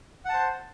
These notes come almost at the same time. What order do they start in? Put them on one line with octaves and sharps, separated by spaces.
F#5 A5 C5